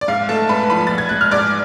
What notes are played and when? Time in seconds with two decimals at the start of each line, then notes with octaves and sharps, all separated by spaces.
0.01 D5
0.08 G#2 F5
0.29 A3 A4 A5
0.49 G#2 B4 B5
0.70 F3 B4 B5
0.87 B3 A6
0.98 G#6
1.09 G#3 F#6
1.21 F6
1.31 G#2 D5 D6